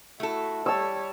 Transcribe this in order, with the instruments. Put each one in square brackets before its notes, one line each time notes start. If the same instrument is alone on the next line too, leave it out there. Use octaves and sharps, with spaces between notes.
[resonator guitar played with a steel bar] A3 A4 [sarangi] E4 [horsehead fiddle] F#4
[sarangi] G3 [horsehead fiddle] C#5 [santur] A5 E6